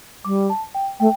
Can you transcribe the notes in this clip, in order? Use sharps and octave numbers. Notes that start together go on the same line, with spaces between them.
G3 D6
A5
G5
A3 G5